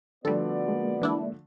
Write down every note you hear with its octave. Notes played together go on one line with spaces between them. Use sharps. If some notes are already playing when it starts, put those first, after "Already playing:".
D3 F3 G3 A3 B3 F#4 A4 D5
G#3 A#3
E3 D4 E4